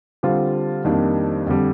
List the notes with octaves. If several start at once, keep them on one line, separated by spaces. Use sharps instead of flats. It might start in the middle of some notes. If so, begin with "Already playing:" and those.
D3 G3 C4 F4
F2 D#3 G3 A#3 D4
F2 D3 G3